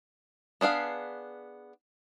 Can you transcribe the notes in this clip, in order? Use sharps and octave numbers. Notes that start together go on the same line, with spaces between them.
B3 D4 G#4 F5